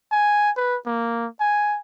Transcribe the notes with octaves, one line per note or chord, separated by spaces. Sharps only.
G#5
B4
A#3
G#5